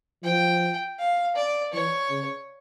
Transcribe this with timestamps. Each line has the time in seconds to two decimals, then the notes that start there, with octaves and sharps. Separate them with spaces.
0.24 F3 G5
0.99 F5
1.36 D5
1.73 E3 C#5
2.10 C#3